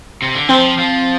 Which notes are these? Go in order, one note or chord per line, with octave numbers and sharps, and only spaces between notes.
C3
D3
F3 C4
F3